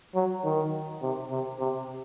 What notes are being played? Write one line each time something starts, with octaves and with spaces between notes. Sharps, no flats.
F#3
D#3
C3
C3
C3